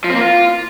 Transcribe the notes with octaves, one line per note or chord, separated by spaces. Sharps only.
F3
C4
A#3
F4